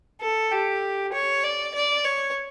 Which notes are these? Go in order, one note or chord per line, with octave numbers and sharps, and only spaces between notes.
A4
G4
C#5
D5
D5
C#5